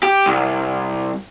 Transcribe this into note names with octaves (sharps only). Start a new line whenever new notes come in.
G4
C2